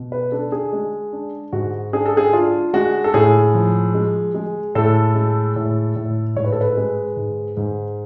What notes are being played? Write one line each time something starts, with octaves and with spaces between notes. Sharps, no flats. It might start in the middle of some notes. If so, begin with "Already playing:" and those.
Already playing: B2
B4
D4 A4
G#4
G#3
D4
G#2 F#4
D4 G#4
A4
G#4
D4 F4
G#3 F#4
A4
A2 G#4
F3
G#3
G#3
A2 A4
G#3
A2
A2
G#2 C#5
B4
A4
B4
G#3
G#2
G#2